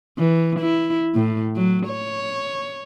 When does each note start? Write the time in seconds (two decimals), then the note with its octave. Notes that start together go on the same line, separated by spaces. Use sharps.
0.18 E3
0.60 E4
1.15 A2
1.56 F#3
1.87 C#5